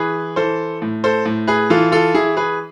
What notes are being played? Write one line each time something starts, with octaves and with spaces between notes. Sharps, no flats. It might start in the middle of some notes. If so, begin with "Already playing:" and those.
Already playing: E3 G#4 B4
E3 A4 C5
A2
A4 C5
A2
G#4 B4
E3 F4 A4
F4 A4
E3 E4 G#4
G#4 B4